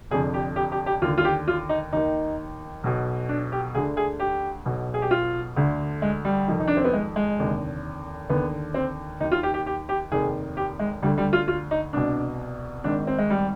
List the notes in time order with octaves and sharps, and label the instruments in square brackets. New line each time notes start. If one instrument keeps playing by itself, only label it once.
[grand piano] F1 F2 D3 G#4
G4
G4
G4
G4
D#2 F4
D3
F4
G4
F4
D#4
D#2 D#3 D#4
B1 B2
D4
G4
D2 D3 G#4
G#4
G4
B1 B2
G#4
G4
F4
D2 D3
G#3
G3
F1 F2 D#3
D#4
D4
C4
B3
G#3
G#3
F1 D#2 D3
D#2 D3 B3
C4
D#2 D#4
D#3
F4
G4
G4
G4
G4
F1 D#2 D#3 G#4
G4
G#3
D2 D3 G3
G3
F4
F4
D#4
C2 B2 D4
G#1 G#2 D#3 D4
C4
G#3
G3